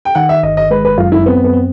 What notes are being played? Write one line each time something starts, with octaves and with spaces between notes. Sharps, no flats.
G5
D#3 F#5
E5
G1 D#5
D#5
G#3 B4
B4
F#2 F4
E4
B3 C4
B3
C4